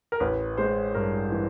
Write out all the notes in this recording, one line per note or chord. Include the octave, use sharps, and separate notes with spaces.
A#4
A1 B4
G#3 C5
G2 A#4
E3